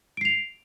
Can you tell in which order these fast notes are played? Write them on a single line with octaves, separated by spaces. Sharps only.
D7 C7 F7